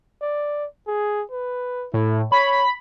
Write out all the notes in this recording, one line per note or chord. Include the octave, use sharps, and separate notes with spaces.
D5
G#4
B4
A2 E4
C#5 B5